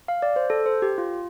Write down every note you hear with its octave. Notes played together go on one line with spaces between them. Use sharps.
F5
D5
C5
A4
C5
G4
F4